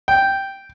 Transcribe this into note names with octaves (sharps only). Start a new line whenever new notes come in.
G5